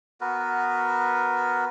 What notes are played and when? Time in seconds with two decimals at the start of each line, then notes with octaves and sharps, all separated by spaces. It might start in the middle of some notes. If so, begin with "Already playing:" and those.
0.21 B3 F#4 A#4 B4